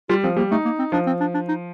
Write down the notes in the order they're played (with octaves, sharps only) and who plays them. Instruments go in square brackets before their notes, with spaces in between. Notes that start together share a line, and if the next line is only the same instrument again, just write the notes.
[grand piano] G3 [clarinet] F4
[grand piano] F3 [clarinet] C4
[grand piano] G3 [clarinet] A#3
[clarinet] A3 [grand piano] D#4
[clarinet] A#3
C4
[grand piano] F3 [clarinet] D4
[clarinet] C4
D4
D4
D#4